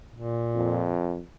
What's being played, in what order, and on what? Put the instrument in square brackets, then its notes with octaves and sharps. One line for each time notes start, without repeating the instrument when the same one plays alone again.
[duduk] A#2
[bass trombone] F2